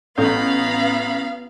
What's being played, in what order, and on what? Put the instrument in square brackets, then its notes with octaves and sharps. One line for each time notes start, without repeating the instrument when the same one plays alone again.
[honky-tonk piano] A1 [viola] B3 F5 [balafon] A4 [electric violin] A#5 B5